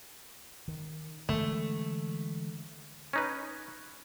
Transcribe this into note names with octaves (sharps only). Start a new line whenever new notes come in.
D#3
D3 E3 G#3 A3
C#4 D#4 B4